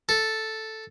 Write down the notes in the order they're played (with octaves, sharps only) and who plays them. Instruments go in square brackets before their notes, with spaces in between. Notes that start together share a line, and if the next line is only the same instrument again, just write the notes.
[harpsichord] A4